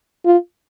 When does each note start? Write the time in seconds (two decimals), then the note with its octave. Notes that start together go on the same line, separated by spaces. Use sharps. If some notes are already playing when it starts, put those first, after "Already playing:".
0.26 F4